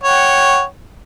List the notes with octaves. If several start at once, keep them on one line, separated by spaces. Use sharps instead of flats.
C#5 F#5 G5